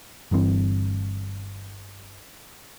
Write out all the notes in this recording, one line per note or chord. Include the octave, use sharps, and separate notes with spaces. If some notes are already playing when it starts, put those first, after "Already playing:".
G1 G2 E3 C4